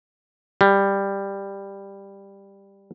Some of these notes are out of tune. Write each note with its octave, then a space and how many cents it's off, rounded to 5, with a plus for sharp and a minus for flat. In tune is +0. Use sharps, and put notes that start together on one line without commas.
G3 +10